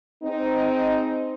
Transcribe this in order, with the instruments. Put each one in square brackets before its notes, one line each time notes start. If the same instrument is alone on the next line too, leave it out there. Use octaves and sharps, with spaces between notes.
[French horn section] C4 D#4 G#4